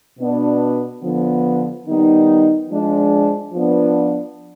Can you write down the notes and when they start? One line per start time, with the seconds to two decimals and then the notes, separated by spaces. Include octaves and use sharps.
0.18 B2 B3 D4
1.01 D3 F3 B3
1.86 D#3 G3 B3 D#4
2.70 F3 G#3 D4
3.53 F3 B3 D4